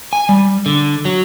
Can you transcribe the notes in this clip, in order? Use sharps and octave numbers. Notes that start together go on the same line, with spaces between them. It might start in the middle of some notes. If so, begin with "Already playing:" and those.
G#5
G3
D3
F#3